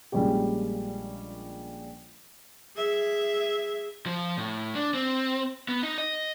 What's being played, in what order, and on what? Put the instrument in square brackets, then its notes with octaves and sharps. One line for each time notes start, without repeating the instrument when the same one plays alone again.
[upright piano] A#1 A#2 G3 G#3 C#4 G4
[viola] G#4 E5
[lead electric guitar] F3
A2
D4
C4
B3
D#4
D#5